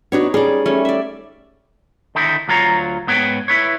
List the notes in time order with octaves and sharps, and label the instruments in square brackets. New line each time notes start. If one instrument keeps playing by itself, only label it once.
[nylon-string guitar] B3 D4 F#4 [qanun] D#4 C#5
[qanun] G3 C#4 C#5 [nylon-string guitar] G#4 D5
[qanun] G3 A3 C#4
D5 E5
[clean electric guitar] D3 D#3 D#4 E4
D2 F#3 F4 C#5 A#5
G#2 B3 B4 C#5 G5
E4 B4 C#5